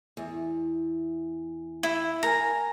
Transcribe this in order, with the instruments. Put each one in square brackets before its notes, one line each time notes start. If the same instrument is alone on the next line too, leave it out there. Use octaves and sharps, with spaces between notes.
[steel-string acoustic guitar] E2
[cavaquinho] E4
[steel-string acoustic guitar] A#4 G#5 [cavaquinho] A#5